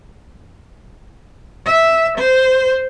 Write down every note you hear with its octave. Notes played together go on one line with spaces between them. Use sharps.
E5
C5